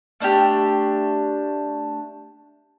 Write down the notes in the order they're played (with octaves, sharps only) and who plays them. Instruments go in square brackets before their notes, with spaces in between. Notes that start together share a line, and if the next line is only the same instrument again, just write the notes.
[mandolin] A3 D4 D#4 G4